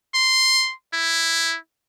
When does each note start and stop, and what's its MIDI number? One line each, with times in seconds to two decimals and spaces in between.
0.14 0.73 84
0.93 1.57 64